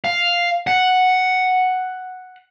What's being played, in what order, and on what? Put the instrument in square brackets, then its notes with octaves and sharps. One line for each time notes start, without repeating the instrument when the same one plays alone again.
[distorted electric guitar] F5
F#5